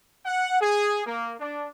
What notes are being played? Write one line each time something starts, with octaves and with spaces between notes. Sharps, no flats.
F#5
G#4
A#3
D4